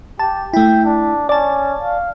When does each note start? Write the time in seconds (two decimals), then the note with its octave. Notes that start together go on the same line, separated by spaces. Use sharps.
0.19 G4 A5
0.53 A3 E4 G5
0.85 D4
1.29 C#4 D5 A5
1.82 F5